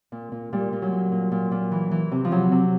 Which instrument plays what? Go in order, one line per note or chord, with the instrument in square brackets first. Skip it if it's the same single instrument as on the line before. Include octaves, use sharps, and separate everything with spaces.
[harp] A#2
A#2
A#2 G3
A#2
F#3
A#2
A#2
A#2
A#2
E3
E3
C3
F3
C3 F#3
C3